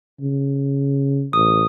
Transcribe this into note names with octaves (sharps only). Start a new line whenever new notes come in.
C#3
A1 D#6